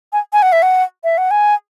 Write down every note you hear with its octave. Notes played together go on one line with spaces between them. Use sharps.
G#5
G#5
F#5
E5
F#5
E5
F#5
G#5